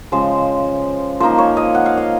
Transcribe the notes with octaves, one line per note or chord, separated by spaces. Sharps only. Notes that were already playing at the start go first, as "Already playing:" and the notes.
C#3 F3 G#3 C5
F3 A#3 D#4 C5
C#5
D#5
F#5
F5
D#5